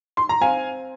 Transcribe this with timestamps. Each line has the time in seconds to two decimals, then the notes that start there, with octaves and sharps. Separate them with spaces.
0.17 C6
0.29 A#5
0.41 C4 F5 G#5